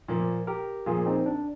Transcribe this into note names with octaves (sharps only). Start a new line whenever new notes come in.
A#2 F3 A#3
G4 A#4
A#2 F3 A#3 F4 G#4
C4 D#4
D4